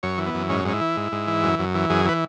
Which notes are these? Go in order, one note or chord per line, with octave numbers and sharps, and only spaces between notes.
F#2 C#5
E3
B3
F#2
G#2 C#4
G#2 C#4
E4
E3
G#2
G#2
E3
F#2
F#2
E3
F#2 G#4
E3 B4